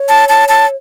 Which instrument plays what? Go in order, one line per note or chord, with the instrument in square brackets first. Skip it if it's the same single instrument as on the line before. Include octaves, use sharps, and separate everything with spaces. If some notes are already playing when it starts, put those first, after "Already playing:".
Already playing: [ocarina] C#5
[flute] A5
A5
A5